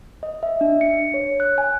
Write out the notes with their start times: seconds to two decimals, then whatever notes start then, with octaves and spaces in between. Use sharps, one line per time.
0.23 D#5
0.43 E5
0.61 D4
0.81 C#7
1.14 C#5
1.40 F#6
1.58 G#5